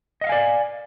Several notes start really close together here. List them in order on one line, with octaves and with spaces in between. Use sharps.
D#5 F#5 F5 G#5 D5